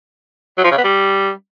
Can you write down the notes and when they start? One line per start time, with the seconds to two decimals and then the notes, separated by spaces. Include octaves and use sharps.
0.57 F#3
0.64 F3
0.71 C#3
0.78 B3
0.84 G3